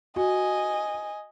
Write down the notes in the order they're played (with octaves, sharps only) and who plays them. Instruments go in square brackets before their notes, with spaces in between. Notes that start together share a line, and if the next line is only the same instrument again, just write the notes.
[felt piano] F#4 [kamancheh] D#5 G#5